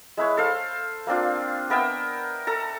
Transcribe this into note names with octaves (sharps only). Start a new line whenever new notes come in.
G#3 E4 B4 C#5
A4 C5 F5
A#3 C4 D4 F4
B3 A#4 E5 G5
A4 A#5